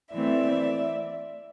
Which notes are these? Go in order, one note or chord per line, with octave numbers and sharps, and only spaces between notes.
E3 A3 C4 D5 E5